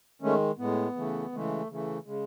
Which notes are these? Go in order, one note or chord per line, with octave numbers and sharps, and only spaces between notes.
D#3 G#3 A3 C#4
A2 G#3 B3
C#3 E3 A3
C#3 E3 G#3 A3
C#3 E3 A3
C#3 G#3